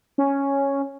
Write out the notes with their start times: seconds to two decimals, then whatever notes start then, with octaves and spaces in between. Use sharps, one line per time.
0.18 C#4